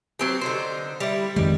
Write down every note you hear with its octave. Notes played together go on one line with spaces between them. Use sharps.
F#3 C4 G4
D3 D#4 C5
G3 E4
F2 D#3 G3 G#3